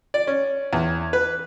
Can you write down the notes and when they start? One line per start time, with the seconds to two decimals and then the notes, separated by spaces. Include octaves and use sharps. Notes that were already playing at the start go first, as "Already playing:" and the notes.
0.14 D5
0.27 C#4
0.73 E2
1.13 B4